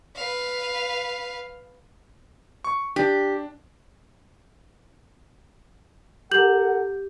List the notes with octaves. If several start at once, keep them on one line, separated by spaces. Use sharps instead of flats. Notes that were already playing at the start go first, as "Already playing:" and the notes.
B4 F5
C#6
D4 G4
G4 A4 A#4 F#5 G6 F#7